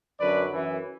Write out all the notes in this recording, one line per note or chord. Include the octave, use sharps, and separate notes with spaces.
F#2 D3 F#3 B4 D5
F#2 E3